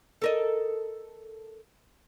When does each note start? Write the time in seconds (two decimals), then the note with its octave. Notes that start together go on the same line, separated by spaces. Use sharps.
0.22 A4 A#4 D#5